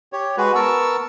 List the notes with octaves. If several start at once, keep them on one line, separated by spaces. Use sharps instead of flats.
G4 C#5
G#3 F#4 B4
B3 A#4 A5 C#6 E6